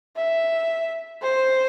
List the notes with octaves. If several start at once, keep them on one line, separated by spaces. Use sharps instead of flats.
E5
C5